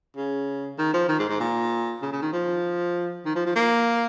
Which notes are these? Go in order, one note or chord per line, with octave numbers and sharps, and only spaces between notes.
C#3
D#3
F3
D#3
G#2
G#2
A#2
C#3
C#3
D#3
F3
D#3
F3
F3
A#3